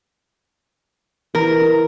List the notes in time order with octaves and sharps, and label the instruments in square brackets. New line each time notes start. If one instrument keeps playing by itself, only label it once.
[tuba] E3 [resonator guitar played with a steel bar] A#4